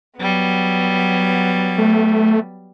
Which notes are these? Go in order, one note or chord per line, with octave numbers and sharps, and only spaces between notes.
F#3 G3 B3
A3